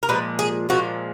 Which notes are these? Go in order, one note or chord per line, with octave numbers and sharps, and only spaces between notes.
A#4
A#2 F3 G#3 B4
G#4
A#2 F3 G#3 F#4